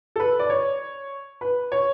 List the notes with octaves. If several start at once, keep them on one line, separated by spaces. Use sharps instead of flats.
A4
B4
D5
C#5
B4
C#5